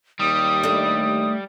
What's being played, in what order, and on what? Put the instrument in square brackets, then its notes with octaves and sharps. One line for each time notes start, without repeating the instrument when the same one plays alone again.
[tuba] D#2 [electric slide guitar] G3 [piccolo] D#6
[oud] A3 D4